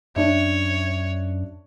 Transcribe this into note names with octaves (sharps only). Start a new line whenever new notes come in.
F#2 D4 C#5 E5